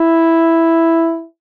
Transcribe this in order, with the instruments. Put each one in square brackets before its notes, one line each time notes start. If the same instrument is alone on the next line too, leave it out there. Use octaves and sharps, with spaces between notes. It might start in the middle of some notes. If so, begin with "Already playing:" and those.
Already playing: [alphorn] E4